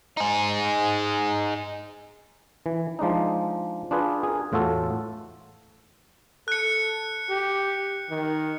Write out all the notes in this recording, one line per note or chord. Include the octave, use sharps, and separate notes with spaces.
D#4 G#4
E3
F3 G#3 D4 D#4
D4 F4 G#4 B4
G#4 A#4
E2 A2 F4 F#4 A4
A4 F#6 C#7
G4
D#3